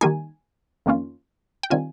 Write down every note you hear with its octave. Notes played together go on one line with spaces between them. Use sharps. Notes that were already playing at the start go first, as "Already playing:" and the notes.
D#3 G3 A#3 D#4 G#5
F2 D#3 A#3 C#4 F4
G5
D#3 G3 C4 F4 G#5